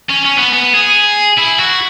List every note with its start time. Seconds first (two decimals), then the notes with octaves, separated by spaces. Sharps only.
0.10 C#4
0.25 C#4
0.38 B3
0.53 B3
0.74 G#4
1.38 E4
1.59 F#4